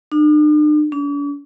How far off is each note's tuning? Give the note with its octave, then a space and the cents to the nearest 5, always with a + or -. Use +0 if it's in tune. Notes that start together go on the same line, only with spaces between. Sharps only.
D4 +45
D4 -45